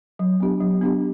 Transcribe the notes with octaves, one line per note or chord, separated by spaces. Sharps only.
F#3
B3 D4 G4
F#3
B3 D4 G4